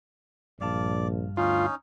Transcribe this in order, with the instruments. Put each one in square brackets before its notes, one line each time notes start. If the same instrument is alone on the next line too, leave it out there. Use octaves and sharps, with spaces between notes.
[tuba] A#1 [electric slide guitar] G2 F5 A5 [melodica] D5
[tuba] D2 [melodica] C#4 D#4 [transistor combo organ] F4